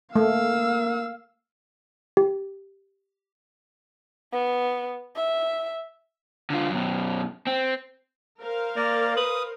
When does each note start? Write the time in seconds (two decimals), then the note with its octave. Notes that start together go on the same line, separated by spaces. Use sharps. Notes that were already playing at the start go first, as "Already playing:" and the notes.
0.16 A3 A#3 F5 E6
2.17 G4
4.32 B3
5.16 E5
6.50 D3 F4
6.69 F#2 B2
7.47 C4
8.40 A#4 C5 F5
8.76 A#3 D5
9.17 B4 D#6